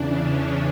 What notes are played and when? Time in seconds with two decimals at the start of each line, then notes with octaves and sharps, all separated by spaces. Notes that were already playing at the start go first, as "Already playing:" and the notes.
Already playing: E2 C#3 E3 D4
0.13 C#4